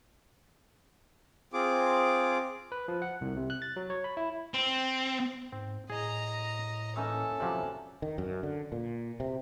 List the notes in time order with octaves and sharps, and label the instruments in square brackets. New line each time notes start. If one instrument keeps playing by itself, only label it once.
[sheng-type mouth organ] C4 F4 G#4 D6
[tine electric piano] B4
F3
F#5
C2
C3
F#6
A6
F#3
C#5
B5
E4
[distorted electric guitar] C4
[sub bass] G#2 [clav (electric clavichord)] C4
[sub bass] A2 [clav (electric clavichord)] G#4 [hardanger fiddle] D#5 A#5
[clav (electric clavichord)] E3 D#4 [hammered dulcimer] A#3 C#4 E5 [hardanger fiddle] A4
[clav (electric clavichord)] C3 F3 F#3 [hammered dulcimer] D5
[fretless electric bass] D#3
F#2
D3
A#2
C3